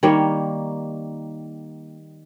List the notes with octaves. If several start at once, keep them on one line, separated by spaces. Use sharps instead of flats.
D#3 G3 A#3 C#5